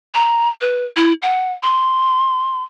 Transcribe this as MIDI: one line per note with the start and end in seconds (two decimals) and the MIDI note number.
0.14 0.49 82
0.61 0.85 71
0.96 1.13 64
1.22 1.52 78
1.63 2.63 84